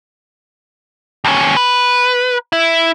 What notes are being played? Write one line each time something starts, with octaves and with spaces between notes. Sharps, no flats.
D#2 C#4
B4
E4